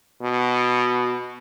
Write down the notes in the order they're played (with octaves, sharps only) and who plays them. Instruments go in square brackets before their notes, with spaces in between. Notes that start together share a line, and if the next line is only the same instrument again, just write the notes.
[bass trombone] B2